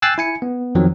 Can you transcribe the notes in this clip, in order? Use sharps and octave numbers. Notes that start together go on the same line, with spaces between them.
G5 G#5 E6 F#6 A6 C7
E4 G#5 C#7
B3
F2 D#3 F3 F#3 C4